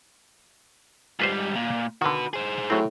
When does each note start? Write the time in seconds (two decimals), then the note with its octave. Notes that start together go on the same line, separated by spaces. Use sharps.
1.20 G#2 G3 F4 B4 C5
1.55 A#2
2.02 D3 D#3 F#4 B4
2.33 G#4 C5
2.70 A2 F#3 C4